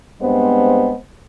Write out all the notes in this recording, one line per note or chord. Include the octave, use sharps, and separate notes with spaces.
G2 G#3 B3 C4 C5